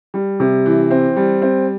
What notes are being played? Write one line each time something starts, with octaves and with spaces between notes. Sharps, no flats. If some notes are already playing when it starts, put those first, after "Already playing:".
G3
C3
E3
C4
G3
C4